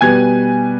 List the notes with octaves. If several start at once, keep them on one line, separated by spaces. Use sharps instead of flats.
B2 G3 B3 G#5 G#6